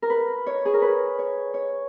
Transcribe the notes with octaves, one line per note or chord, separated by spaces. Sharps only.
A#4
B4
C#5
G#4
A#4
B4
C#5
C#5